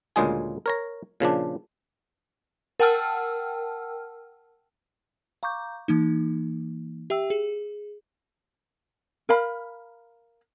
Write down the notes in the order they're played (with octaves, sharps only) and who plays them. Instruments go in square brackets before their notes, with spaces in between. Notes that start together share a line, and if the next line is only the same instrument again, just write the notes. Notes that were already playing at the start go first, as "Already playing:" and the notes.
[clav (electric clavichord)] D2 A#2 C#3 G#3 G#4 G#5
A#4 C#5 A#5
A#2 C#3 F3 D4
[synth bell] A#4 F#5 G5 A5 E6 F6
F5 A#5 C#6 D6 G6
E3 A#3 D#4
G4 E5 G5 E6
G#4
[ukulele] A#4 F5 B5